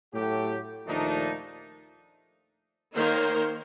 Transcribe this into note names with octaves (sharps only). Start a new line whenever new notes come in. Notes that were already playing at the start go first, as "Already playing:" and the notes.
A2 F#3 A3 G4
D#2 A#2 F3 A3 D4 D#4
D#3 A#3 D#4 A#4 C5 C#5